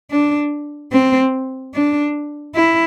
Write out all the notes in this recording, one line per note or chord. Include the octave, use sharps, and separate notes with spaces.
D4
C4
D4
E4